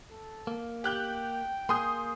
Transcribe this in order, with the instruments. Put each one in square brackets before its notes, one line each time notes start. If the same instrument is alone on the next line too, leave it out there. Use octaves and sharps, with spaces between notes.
[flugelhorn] A4
[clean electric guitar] A#3
[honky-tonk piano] G4 F#6 G6 [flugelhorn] G5
[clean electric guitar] A#3 G#4 [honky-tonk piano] C6 D#6 G6